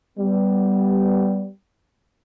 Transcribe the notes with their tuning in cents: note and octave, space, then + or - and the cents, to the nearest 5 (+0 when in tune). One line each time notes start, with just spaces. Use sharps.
G3 -10 B3 +5